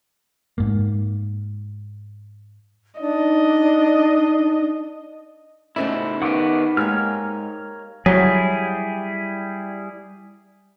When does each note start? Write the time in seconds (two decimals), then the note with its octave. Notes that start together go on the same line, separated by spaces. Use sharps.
0.58 G#2 A#3
3.00 D4 D#4 D5 D#5
5.76 A2 C#3 D#4 E4 C5 D5
6.22 D#3 B3 F#5 C#6 D6
6.77 G#2 A#3 G4 C#5 A#5 F6
8.06 F#3 G3 E4 G#4